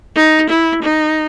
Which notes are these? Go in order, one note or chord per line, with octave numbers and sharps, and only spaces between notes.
D#4
E4
D#4